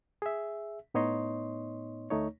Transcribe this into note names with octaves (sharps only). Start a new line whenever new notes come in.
G#4 E5
A2 B3 D#4 C#5 D#5 C6
D2 A3 D#4 C#5